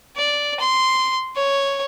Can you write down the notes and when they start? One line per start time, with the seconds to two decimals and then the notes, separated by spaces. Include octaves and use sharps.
0.16 D5
0.60 C6
1.36 C#5